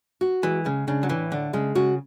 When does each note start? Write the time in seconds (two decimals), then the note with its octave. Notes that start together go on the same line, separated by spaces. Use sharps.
0.21 F#4
0.43 E3 G#3
0.65 C#3 G#3
0.87 C#3 D4
1.03 F#3
1.09 A2 E3
1.32 D3 D4
1.53 C#3 G#3
1.75 C#3 F#4